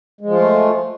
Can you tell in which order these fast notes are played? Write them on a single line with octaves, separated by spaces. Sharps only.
G#3 F3 F4 A3